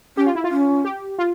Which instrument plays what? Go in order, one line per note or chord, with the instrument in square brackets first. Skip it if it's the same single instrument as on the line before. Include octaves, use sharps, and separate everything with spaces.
[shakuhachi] C#4 [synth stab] G4
[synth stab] F4
E4
F4
[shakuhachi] C#4
[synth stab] G4
F4